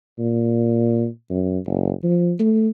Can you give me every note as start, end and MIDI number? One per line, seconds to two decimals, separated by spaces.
0.19 1.06 46
1.30 1.59 42
1.67 1.92 30
2.03 2.33 53
2.39 2.68 57